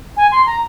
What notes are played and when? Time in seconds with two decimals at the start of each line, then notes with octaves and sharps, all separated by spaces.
0.17 G#5
0.32 C6
0.46 A#5